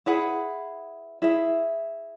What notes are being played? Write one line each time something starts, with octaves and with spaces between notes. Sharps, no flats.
E4 G#4 B4 F#5
E4 G#4 E5